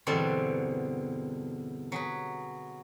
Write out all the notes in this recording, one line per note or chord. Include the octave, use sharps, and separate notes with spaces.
E2 G2 B2 D3 C4
F#3 G#4 B4